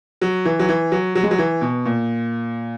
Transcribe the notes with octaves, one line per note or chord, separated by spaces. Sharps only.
F#3
E3
F#3
E3
F#3
F#3
G#3
F#3
E3
B2
A#2